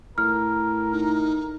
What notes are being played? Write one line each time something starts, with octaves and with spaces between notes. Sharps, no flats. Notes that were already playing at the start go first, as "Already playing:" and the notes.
A2 A#4 F6
D#4